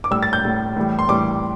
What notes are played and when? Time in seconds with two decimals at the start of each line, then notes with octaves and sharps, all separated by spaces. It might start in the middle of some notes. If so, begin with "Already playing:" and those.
0.04 D6
0.11 A2 G3 E6
0.23 A6
0.33 G6
0.44 A2 G3
0.76 A2 E3 G3
0.99 C6
1.09 A2 E3 G3 D6